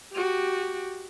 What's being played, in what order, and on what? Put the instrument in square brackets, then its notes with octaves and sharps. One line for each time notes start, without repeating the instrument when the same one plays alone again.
[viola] F#4 G4